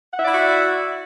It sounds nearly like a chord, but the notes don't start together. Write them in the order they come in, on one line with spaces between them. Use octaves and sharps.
F#5 E5 D5 E4 F#4